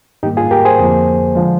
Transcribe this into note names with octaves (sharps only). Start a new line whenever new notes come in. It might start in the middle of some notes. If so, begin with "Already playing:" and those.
G#2 D#3 G3 A#3 D#4 G4
F4 G#4
G4 A#4
G#4 C5
F2 D3 F3 A#3
D3 F3 G#3